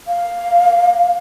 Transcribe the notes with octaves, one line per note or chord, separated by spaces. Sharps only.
F5